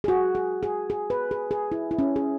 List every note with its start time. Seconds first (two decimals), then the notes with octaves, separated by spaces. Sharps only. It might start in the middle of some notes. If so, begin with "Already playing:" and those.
0.04 G#4
0.08 F#4
0.35 G#4
0.63 G#4
0.90 G#4
1.10 B4
1.31 G#4
1.51 G#4
1.72 E4
1.91 E4
1.99 C#4
2.16 G#4